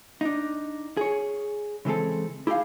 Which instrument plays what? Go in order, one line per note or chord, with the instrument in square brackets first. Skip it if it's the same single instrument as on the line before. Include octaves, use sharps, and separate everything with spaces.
[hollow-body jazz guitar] D4 D#4
G#4 C#5
C#3 E3 G#3 C4 A4
E4 G4 G#4 D#5 F5